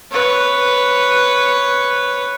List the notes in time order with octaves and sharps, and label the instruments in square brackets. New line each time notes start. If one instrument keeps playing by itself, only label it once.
[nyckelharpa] B4 C#5